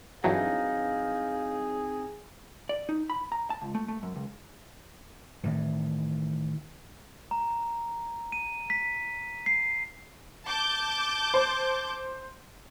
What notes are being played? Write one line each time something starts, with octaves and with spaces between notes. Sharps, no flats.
G2 E3 F#3 C4 D#4 G#4 F5
D5
D#4
B5
A#5
A5
C#2
A3
A3
F#2
C#2
A2 D#3 E3
A#5
D#7
B6
C7
A5 D6 G6
C5